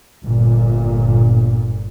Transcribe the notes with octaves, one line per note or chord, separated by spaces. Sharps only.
G1 A#2